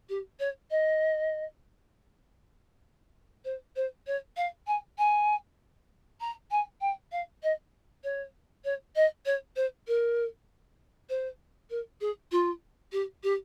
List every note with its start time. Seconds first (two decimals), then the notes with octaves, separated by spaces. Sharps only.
0.09 G4
0.39 C#5
0.70 D#5
3.45 C5
3.76 C5
4.07 C#5
4.37 F5
4.67 G#5
4.98 G#5
6.20 A#5
6.51 G#5
6.81 G5
7.12 F5
7.43 D#5
8.04 C#5
8.65 C#5
8.96 D#5
9.26 C#5
9.56 C5
9.87 A#4
11.09 C5
11.70 A#4
12.01 G#4
12.32 F4
12.92 G4
13.23 G4